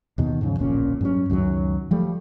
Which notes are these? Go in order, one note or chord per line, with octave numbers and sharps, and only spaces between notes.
D#2 B2 D#3
G#2 C#3 F3
D1 A#1 A#2 C#4
G2 F#3 C#4
C#2 F#2 D#3 F#3
F3 G3 A3